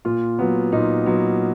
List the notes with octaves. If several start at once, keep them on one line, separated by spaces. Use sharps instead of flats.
A#2 F4
F#3 B3
A#2 D#4
F#3 B3